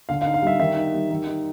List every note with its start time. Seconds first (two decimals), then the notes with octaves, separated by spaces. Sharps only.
0.09 D3 F5
0.22 F5
0.26 D#4
0.34 F5
0.43 G3 E5
0.59 D#3 E5
0.77 D#4
0.93 G3
1.11 D#3
1.27 D#4